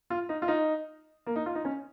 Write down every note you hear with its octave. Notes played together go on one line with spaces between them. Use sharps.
F4
D#4
F4
D#4
A#3
D#4
F4
D#4
C#4